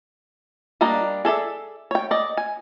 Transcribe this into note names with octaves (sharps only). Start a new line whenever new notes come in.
G3 A#3 D4 D#5 A#5
G#4 A4 D5 E5
C#5 G5
D5 D#5
G#5